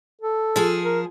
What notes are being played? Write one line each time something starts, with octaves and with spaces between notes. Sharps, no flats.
A4
F3 G#4
A#4